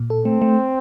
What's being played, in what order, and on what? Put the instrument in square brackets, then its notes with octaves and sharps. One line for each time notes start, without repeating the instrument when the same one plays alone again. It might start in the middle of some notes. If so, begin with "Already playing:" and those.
Already playing: [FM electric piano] A#2
A4
[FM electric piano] A3 [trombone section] C4
[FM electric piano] A3